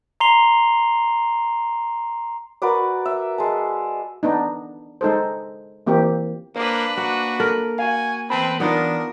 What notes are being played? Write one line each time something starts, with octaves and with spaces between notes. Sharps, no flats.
A#5 C6 C7 F7 G7
F#4 A#4 B4 D5
E5
G#3 A5
B3 D4 D#4
G#3 D#4 A4 C5
E3 A#3 C4 G4
A#3 D4 B4 C5
A#3 F#4
A4 A#4
F#4 F5 G#5
E2 C4 B4 A5 B5
B3 D4 D#4 F4 A#4